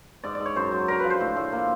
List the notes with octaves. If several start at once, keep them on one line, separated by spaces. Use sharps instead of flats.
G#2 D5
D5
G#2
C#5
F#2 C5
F#3
D3 A#4
F3 B4
C5
A2
A2
A#3